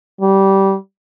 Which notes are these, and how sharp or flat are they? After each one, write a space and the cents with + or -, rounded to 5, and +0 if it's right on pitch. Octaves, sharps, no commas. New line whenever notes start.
G3 -15